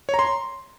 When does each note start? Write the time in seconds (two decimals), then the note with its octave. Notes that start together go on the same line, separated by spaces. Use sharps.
0.09 C#5
0.14 A#5
0.19 C6